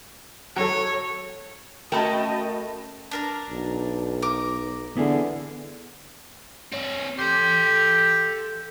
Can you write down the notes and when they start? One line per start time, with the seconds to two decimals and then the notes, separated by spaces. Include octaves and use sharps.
0.56 F#3 A4 C#5
1.92 A3 C#4 F#4 A#4 D#5 G5 A5 B5
3.11 D4 A#4 A#5
3.50 B1
4.22 A#4 D6
4.97 D3 B3 E4 G#4
6.73 C4 C#5
7.19 G4 A4 C6